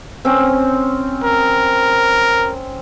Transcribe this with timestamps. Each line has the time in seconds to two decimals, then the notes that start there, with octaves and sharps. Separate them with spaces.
0.25 C4 C#4
1.24 A#4